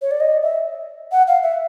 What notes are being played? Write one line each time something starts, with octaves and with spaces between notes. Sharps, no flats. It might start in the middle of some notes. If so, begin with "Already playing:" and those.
C#5
D5
D#5
E5
F#5
F5
E5